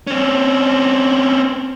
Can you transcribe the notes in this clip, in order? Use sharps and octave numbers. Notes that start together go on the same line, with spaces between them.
C4 C#4